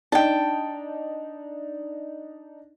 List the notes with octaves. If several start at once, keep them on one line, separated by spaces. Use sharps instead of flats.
D4 D#4 G5 A5